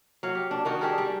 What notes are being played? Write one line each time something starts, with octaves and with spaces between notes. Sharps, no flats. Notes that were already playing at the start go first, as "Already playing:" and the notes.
F#3 F5
G4
D4
D#3 D#4 F#4
D4 G4 G#4 A#4
G3